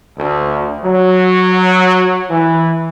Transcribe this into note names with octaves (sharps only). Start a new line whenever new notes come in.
D2
F#3
E3